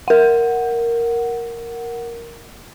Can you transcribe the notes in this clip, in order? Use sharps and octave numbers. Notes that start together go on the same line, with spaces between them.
A#4 F#5